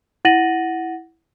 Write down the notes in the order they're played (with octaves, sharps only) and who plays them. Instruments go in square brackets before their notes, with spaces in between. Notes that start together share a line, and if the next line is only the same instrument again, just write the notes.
[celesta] E4 F#5 A6 A#6 D#7 F#7